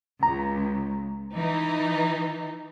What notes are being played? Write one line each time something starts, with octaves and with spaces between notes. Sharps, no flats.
C#2 A#5
E3 D#4